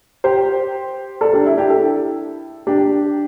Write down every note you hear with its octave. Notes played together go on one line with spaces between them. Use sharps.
G4 C5
A4 D5
D4 G4
E4
D4 G4
E4 A4
D4 G4